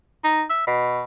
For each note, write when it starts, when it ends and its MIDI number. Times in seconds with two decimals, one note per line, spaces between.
0.24 0.43 63
0.50 0.65 76
0.67 1.02 47